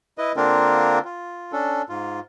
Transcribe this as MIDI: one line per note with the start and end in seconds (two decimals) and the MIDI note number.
0.18 0.32 64
0.18 0.32 71
0.18 0.32 75
0.36 0.99 50
0.36 0.99 58
0.36 0.99 60
0.36 0.99 62
0.36 0.99 65
0.36 0.99 70
1.05 1.52 65
1.52 1.82 61
1.52 1.82 62
1.52 1.82 69
1.89 2.20 44
1.89 2.20 65